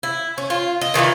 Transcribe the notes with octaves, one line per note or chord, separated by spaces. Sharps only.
E4
C#4
F4
D#5
D#3 E3 F4 D5